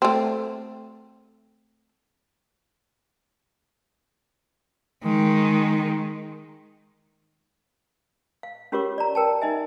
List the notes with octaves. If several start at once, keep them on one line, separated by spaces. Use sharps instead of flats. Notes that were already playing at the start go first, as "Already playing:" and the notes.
A3 C4
D#3 G#3
F5
C#4 F4 G4 A#4 C#5 D6
D5 A#5
A#4 G5 A5
D#4 D#5 E5 G#5